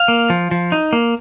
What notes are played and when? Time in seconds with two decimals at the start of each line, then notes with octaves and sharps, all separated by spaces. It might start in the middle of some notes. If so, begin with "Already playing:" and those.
Already playing: F5
0.08 A#3
0.30 F3
0.51 F3
0.72 D#4
0.93 A#3